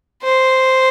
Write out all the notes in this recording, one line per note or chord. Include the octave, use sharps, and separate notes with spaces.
C5